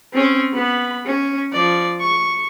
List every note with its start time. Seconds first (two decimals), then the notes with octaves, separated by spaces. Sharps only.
0.13 C4 C#4
0.53 B3 B5
1.06 C#4
1.52 F3 D5
2.00 C#6